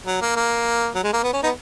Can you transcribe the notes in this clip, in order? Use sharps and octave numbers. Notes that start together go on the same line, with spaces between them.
F#3
A#3
A#3
F#3
G#3
A#3
B3
C#4
B3 D#4